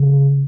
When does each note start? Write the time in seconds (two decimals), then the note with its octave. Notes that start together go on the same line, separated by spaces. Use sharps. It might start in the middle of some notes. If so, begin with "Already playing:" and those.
Already playing: C#3